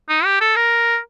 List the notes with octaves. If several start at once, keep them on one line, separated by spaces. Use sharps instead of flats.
D#4
G4
A4
A#4